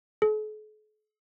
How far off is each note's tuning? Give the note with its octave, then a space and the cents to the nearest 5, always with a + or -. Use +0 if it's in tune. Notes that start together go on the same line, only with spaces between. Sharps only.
A4 -45